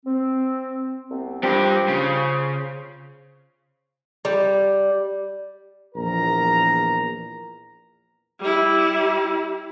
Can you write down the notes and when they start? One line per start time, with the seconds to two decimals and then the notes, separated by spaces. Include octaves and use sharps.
0.06 C4
1.09 C2 B3 C4
1.43 G2 F4 G4 C5
1.89 C#3
4.25 G3
5.95 A#1 E2 A#4 A#5
8.39 G3 E4